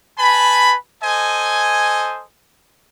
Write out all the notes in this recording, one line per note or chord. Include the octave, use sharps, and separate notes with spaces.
B4 G#5 A5 B5
A4 C5 D#5 G#5